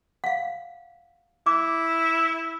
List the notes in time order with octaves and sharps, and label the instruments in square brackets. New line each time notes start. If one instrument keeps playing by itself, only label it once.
[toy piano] F5 F#5
[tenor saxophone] E4 [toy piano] D6